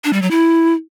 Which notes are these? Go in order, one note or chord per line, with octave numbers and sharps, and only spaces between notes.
D4
G3
F#3
E4